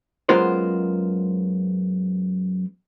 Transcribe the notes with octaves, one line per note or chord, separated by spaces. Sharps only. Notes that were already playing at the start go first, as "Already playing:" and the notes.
F#2 G#3 B3 F4 A#4 C5